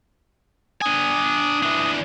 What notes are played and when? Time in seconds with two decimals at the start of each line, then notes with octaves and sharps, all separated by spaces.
0.82 D4 G#5 D#6
1.63 E3 D4